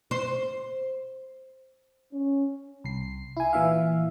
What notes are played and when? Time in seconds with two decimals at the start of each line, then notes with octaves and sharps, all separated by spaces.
0.11 C5
2.12 C#4
2.84 C2 C7
3.37 E4 G#5
3.53 A#2 E3 E5 F5